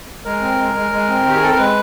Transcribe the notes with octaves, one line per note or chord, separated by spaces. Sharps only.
G#3 A#4
C4
G#3
G#3
G#3
C4
D#3 G4
G#4
C4 A4
A#4
G#3 B4